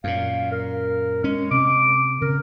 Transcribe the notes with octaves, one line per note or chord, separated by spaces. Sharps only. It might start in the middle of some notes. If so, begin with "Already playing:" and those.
F#2 A#2 F5
A#4
G#3 C#4
C3 D6
C#3 A#4